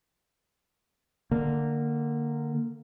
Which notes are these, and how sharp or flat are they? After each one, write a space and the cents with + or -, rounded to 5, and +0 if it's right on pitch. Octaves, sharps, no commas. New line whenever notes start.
D3 +10 A#3 -10